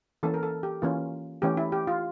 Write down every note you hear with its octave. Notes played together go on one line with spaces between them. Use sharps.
E3 A#3 C#4 A4
A#4
A4
G4
E3 A#3 C#4 F4
E3 A3 C#4 G4
E4
G4
F4